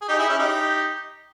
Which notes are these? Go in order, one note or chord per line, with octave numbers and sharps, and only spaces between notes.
G#4
D#4 G4
E4 G#4
C#4 E4
D#4 G4